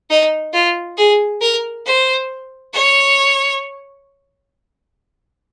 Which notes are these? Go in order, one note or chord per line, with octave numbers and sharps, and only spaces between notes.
D#4
F4
G#4
A#4
C5
C#5